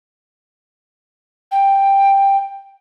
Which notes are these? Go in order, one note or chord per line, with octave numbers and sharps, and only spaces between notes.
G5